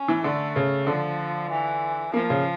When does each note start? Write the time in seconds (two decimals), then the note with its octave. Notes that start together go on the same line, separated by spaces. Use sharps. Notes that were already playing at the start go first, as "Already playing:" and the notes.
Already playing: C#4
0.08 E3
0.23 D3 A3
0.56 C#3
0.87 D3 F3
1.50 E3
2.13 F3 A#3
2.30 C#3